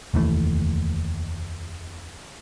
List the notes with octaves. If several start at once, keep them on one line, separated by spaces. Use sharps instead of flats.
F1 D#2 E3 A3